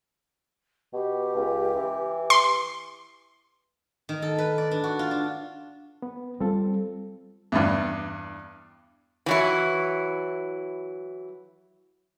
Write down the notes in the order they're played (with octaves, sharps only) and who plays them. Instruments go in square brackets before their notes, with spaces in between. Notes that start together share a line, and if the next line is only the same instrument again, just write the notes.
[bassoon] B2 [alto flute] G4
[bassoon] C#2
E3
[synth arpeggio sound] C6
[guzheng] D#3
A4
B4
D5
D4
F#4
F4
D4
[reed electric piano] B3
[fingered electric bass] G3 [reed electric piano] C4 F4 A4
[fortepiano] E2 G2
[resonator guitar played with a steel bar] E3 F#3 E4